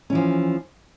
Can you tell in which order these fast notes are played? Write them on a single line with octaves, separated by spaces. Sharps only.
C#4 E3 F3